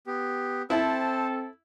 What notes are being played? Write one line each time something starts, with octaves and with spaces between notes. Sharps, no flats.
B3 G4
C4 E4 A4 C5 A5